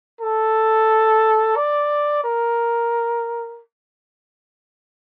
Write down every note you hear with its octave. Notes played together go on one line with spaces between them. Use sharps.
A4
D5
A#4